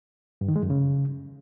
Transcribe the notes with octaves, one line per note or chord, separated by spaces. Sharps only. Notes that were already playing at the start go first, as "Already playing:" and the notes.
G2
D#3
G#3
F#2
C#3